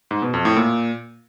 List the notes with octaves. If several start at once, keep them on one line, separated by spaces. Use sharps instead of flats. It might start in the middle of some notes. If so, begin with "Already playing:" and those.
G#2
B2
F2
A2
A#2